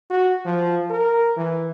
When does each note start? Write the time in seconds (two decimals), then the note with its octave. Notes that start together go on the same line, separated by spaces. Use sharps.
0.11 F#4
0.45 F3
0.90 A#4
1.37 E3